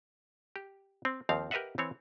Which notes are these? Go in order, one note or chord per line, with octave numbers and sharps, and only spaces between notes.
G4
C4
D#2 F3 C4 F5
G4 A#4 B4 D#5 E5 F#5
E3 C4 C#5